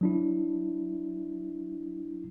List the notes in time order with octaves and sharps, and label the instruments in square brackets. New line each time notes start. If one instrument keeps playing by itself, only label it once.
[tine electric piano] F#3 D4 E4